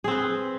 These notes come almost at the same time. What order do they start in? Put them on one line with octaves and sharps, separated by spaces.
G#4 C4 B4